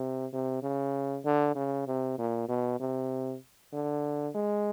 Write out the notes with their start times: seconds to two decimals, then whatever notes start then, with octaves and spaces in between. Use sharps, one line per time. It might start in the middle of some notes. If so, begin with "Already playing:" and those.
Already playing: C3
0.33 C3
0.63 C#3
1.25 D3
1.55 C#3
1.87 C3
2.18 A#2
2.48 B2
2.80 C3
3.73 D3
4.35 G#3